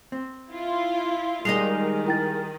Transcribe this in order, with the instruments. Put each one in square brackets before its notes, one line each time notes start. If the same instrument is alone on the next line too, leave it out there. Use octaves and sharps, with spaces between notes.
[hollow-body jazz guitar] C4
[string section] E4 F4
[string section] D#3 [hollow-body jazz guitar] G3 [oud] G#3 D#4 D#5 [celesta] C7 F7
[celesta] E4 G5 A6